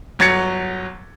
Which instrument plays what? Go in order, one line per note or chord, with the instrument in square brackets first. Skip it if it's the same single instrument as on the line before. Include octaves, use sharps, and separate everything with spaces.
[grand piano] G1 F#3 C#5 G#6 A6 C#7